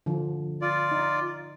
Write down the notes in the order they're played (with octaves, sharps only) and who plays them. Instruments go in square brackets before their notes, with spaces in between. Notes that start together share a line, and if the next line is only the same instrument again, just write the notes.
[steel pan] D3 F3
[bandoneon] F4 D5
[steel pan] D#4